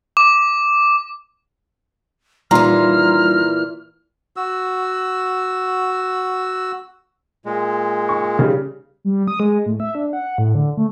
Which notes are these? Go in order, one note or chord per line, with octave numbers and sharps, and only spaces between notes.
D6
A#2 E3 G3 D#4 F4 A#5 C6 F6
F#4 E6
A#2 G#3
C#6
C#3 G3
G3
D#6
G#3
A2
E5
D4
F#5
A2
D3
A3